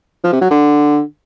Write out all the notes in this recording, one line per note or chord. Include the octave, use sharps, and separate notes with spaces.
F3
C3
F#3
D3